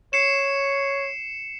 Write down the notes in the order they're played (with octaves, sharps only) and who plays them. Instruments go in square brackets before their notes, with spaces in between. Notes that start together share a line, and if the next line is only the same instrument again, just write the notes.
[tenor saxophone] C#5 [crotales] C7 C#7 E7